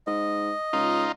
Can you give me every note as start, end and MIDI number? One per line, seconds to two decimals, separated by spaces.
0.07 0.51 44
0.07 1.04 75
0.73 1.07 37
0.73 1.12 63
0.73 1.12 65